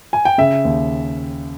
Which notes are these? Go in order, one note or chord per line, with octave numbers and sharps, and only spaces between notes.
G#5
G5
C#3 E5
D#2